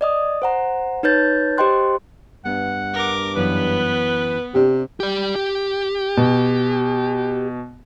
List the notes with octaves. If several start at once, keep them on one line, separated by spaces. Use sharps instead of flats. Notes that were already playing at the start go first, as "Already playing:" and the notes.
D5 D#5 D#6
C5 F#5 A#5
D#4 B4 C#5 G6 A6
G4 C5 D#5 G5 C6 F#6
G2 B3 F#5
A#4 D6
F#2 E3 B3 B4
C3 D4 G4
G4 D5
G4
B2